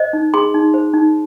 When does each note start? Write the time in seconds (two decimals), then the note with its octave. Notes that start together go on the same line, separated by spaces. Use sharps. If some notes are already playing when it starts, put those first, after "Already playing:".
Already playing: C5 D#5
0.13 D#4
0.34 G#4 C6
0.54 D#4
0.74 C5
0.94 D#4